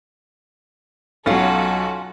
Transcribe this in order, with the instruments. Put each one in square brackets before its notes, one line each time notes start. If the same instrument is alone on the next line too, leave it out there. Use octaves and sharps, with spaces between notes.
[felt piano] B1 F#3 [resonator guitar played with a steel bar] C#4 F4 [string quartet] F#4 A4